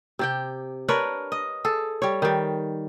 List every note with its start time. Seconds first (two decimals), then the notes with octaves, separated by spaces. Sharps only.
0.19 C3 G4 G5
0.88 D4 A#4 B4 C#5
1.32 D#5
1.64 G#4 A4
2.02 G3 C#5
2.22 D#3 G3